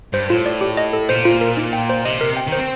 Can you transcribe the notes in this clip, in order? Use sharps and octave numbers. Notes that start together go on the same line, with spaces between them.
G2 C5
A2 F4
D5
G4
D#5
A4
A#2 C5
F4
A#4
D#4
G5
C5
C3 D#5
A#4
G5
D#3 C5
C4